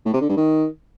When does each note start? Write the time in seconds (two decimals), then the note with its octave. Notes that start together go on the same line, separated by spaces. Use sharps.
0.06 A2
0.13 C3
0.21 D3
0.29 G2
0.37 D#3